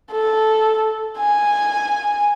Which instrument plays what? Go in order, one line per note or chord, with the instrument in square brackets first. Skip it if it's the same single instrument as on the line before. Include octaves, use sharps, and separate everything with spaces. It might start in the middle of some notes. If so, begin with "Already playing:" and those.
[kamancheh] A4
G#5